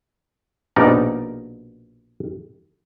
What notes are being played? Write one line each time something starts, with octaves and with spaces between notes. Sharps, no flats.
A#1 B2 D#4 A#4 D5